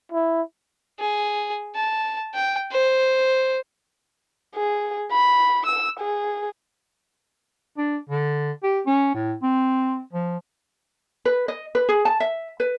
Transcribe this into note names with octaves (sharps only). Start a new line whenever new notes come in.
E4
G#4
A5
G5
C5
G#4
B5
E6
G#4
D4
D3
G4
C#4
A2
C4
F3
B4
D#5
B4
G#4
A5
E5
B4